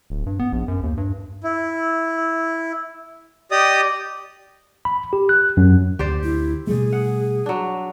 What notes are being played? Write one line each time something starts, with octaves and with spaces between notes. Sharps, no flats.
D1
G2
B3
A#1
F#2
D#2
G2
E4
G4 D5 D#5 D#6
B5
G4
F#6
F#2
D2 G4 C5 D5
E4
B2 G3 A3 G#4
F#5
F#3 D4